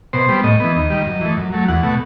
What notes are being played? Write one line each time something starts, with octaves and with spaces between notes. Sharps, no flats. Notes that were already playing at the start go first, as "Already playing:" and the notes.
B2 C5
G3 B3
A2 D#5
E3 B3
D#2
D#3 G3
F#2
E3 A3
F#2
F#3 A3
E2 F#5
B2 A3